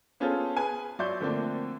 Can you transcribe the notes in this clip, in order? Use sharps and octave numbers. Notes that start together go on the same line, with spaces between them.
B3 C#4 F4 G#4 A4 C5
G#4 B4 G#5
F#3 D5 E5 C6 C#6 G6
D3 F3 A3 A#3 C4 D4